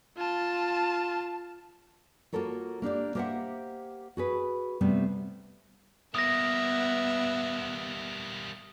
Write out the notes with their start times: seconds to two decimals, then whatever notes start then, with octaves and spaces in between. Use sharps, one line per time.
0.18 F4 A5
2.33 A#3 F4 F#4 A4 A#4 C#5
2.82 A#3 D4 G4 D5
3.15 A#3 G4 C5 D#5 E5 F#5
4.17 F#4 G#4 B4
4.81 C3 G3 A3 B3 C4
6.15 G3 A#3 B3 E5 D#6 A#6